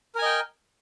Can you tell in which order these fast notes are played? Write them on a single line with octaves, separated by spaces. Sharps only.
A#4 G#5 D#5 G5